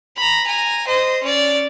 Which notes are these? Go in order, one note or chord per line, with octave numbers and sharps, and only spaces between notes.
A#5 B5
G#5 A#5
C5 D#5
C#4 D5